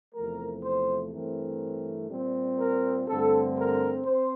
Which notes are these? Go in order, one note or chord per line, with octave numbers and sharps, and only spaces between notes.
E2 C3 F3 A3 A#4
C5
G2 E3 A3 C4 A#4
A#2 G3 C4
A#4
G2 D3 A3 C4 A4
A#4
C4 C5